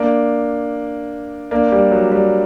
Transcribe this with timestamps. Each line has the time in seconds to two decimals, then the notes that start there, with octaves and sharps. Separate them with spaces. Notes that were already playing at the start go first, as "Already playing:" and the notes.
Already playing: A#3 D4
1.51 A#3 D4
1.72 G3
1.92 F#3
2.12 G3